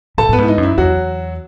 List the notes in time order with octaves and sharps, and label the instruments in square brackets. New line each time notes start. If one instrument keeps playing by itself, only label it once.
[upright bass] A2 [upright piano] A4 A5
[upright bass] A2 [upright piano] B3 B4
[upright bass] G#2 [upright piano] E4
[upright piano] D#4
[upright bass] F#2
[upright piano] E4
[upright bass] E2 [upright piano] F#3 F#4